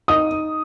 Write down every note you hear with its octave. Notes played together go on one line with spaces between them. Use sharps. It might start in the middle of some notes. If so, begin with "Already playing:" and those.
D#4 D#6
D#4